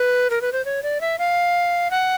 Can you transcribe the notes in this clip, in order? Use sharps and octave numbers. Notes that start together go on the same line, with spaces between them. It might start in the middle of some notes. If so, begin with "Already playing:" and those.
Already playing: B4
A#4
B4
C5
C#5
D5
E5
F5
F#5